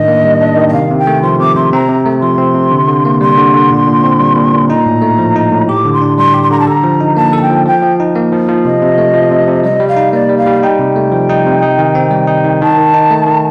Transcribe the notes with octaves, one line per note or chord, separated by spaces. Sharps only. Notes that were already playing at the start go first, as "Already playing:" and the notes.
Already playing: A2 D#3 D4 D#5
A#3
G3
D4
D#3
D#5
C3 F5
C3
G5
A3
F3 C6
C3 D6
C3 C6
C4 A#5
C3
A3
F3 C6
C4
C3
D3
D3
A#3
G3 C6
D3
D3
A#2
A#2
C4
G3
A#2
A#2
D#4 A#5
A2
A3
F3
D#4
A2
G4 D6
D3
C6
D4
G3 C6
G4
C6
D3 A#5
A5
A4 A#5
F3
D#4
A#3 A5
A4 A5
G5
F3
F3 G5
F3
D#4
A#3
F3
F3
C3 D#5
C3
A3
F3
C3
C3
G3 D#5
G3
F5
D#4
A#3 D5
G3
F5
G3
D#4 G5
C3
A3
F3
D#4
C3
D#4
D#3
C4
G3
D#4
D#3
D#3 A5
D#3
D#4
A3
D#3